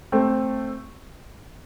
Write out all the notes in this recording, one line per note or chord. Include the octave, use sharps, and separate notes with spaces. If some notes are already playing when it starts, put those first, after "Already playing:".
A3 C4